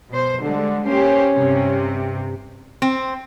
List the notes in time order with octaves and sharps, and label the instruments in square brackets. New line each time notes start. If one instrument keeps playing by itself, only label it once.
[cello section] B2 C5
[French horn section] D3 [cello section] G3 G#3
[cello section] A#3 G4 C5 [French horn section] C#4
[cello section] G2 C3
[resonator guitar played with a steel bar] C4